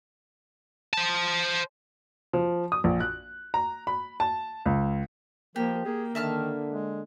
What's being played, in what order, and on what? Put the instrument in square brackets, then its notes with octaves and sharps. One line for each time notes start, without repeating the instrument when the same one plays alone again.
[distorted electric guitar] C5 A5
[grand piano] F3
D#6
A#1
F#6
A#5
B5
A5
C#2
[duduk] F3 [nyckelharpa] A#3 [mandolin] G4
[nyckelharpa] A#3 [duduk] G#4
[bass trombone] D3 [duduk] D#3 [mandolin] E5 A5 F6
[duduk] G#3